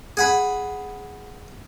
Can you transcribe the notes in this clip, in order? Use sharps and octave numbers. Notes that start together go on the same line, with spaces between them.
G#4 F#5 B5